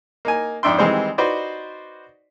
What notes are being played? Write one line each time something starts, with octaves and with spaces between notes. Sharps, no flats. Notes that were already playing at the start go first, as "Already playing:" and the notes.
A#3 D#4 G#5
F2 G#2 D4 E5 G5 C6
D#3 E3 G3 G#3 C4 C5
D#4 F#4 B4 C5 D5